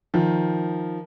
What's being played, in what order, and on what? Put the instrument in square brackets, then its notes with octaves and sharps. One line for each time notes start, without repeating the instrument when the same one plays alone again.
[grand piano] D#3 F3